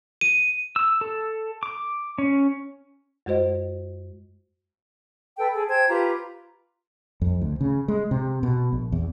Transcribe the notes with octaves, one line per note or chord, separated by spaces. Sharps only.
D#7
E6
A4
D6
C#4
F#2 G#3 F#4 C5 D#5
A4 B4 G5
G#4 A4
C5 G5 A5 G#6
F4 G4 B4 A#5
F2
D2
C#3
G#3
C3
B2
A#1
E2